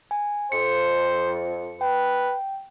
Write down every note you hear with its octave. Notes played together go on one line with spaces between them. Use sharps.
G#5
F2 C5 C#7
B4 G5